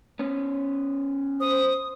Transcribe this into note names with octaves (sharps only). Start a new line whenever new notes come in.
B3 C#4
C5 D#6